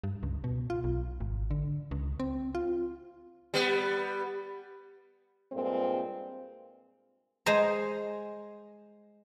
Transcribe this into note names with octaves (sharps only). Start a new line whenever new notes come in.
G2
C#2
B2
F4
B1
G#1
D3
C#2
C4
F4
G3 B3
G2 A#2 G#3 C4
G#3 G#4 C5 A#5